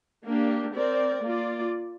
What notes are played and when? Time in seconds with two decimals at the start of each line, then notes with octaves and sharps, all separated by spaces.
0.26 A#3 D4 G4
0.75 C4 A#4 D5
1.23 A#3 F4 D5